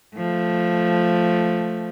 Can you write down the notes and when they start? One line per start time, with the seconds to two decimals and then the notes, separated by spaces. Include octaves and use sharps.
0.17 F3 A3